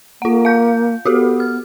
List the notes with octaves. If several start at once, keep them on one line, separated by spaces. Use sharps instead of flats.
A#3 F4 F#5
F5 G6
B3 F#4 G4 A4
F6